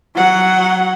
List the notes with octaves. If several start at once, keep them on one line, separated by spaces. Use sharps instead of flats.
F#3 F#5